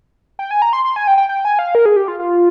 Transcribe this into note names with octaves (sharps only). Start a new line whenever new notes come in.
G5
G#5
A#5
C6
C6
G#5
G5
G5
G5
G#5
F5
A#4
G#4
G4
F4
F4